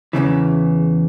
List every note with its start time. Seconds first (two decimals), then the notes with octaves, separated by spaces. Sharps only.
0.13 E2 G#2 C#3 E3